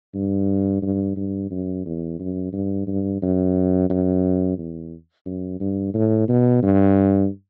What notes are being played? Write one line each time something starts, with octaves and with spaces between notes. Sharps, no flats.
G2
G2
G2
F#2
E2
F#2
G2
G2
F#2
F#2
E2
F#2
G2
A2
B2
G2